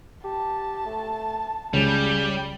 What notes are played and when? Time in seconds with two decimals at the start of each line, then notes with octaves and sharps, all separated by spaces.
0.24 G4 A5
0.86 A3
1.73 C#2 C#3 G3